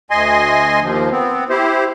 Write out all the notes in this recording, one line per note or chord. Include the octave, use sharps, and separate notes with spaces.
D2 D#5 G#5 C6
D#2 F3
B3 C4
E4 G4 C5